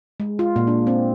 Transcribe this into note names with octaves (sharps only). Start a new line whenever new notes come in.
G#3
F4
A#2
D4
C4